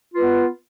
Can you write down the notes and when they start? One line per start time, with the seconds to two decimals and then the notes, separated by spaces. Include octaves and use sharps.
0.14 F4
0.17 B4
0.21 B3